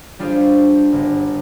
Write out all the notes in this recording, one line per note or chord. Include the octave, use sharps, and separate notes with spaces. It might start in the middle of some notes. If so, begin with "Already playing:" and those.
G3 D4 F4 G4 G#4 C5
G1